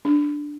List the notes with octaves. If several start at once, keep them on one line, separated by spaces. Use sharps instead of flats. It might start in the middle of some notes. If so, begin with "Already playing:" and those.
D4